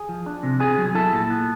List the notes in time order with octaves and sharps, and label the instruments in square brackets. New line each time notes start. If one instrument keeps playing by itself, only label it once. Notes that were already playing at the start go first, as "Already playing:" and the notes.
Already playing: [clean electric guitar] G#4 G#5
F3
D4
C3
B3 G#4 G#5
F#3
E4 A4 A5
A#2
B3